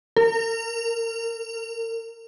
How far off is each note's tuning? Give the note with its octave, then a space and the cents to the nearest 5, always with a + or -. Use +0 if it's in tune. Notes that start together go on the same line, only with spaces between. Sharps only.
A#4 -30